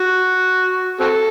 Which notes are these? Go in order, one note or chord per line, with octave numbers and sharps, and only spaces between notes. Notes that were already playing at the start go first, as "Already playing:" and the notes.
Already playing: F#4
C4 F#4 A4